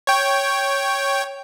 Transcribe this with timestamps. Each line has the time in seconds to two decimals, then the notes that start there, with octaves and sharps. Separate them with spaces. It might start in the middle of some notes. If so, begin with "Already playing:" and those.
0.07 C#5 G5